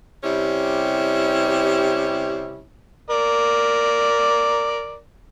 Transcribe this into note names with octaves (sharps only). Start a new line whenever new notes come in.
C3 G3 C#4 E4 G4
A#4 D5